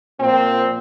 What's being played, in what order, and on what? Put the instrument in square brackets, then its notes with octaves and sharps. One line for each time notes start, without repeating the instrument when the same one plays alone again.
[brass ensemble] A#2 F3 A#3 C4